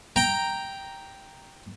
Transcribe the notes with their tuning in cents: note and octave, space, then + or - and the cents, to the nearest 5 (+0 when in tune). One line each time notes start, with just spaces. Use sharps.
G5 +0 A#5 +0